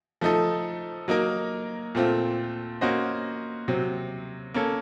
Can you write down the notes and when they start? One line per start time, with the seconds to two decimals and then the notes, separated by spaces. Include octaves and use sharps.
0.21 F3 A3 D#4 A4
1.08 F#3 A#3 D#4 A#4
1.95 A#2 A3 C4 F4
2.81 A#3 C#4 F#4 C5 D#5
3.68 C3 F#3 C4
4.54 A#3 C#4 A4